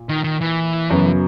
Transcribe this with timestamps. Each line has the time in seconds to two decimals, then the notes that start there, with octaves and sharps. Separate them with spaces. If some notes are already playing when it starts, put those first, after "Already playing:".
Already playing: A#2
0.09 D#3
0.24 D#3
0.41 E3
0.90 F#2 C#3 F#3 B3